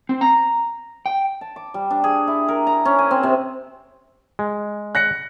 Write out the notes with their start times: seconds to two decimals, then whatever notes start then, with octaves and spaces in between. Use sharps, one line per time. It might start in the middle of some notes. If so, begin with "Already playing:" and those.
0.09 C4
0.21 A#5
1.06 G5
1.41 A5
1.56 D6
1.74 G3
1.91 D4
2.04 G#4
2.27 E4
2.49 A#4
2.67 A#5
2.85 C#4
2.99 G#5
3.11 C4
3.23 C3
4.39 G#3
4.95 F#6 A#6 C#7